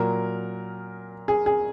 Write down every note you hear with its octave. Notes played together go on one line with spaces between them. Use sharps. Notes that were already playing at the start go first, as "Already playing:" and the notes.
Already playing: A#2 F#3 A#4
G#4
G#4